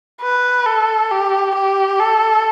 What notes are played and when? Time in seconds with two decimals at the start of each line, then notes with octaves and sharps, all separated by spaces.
0.21 B4
0.66 A4
1.11 G4
1.55 G4
2.00 A4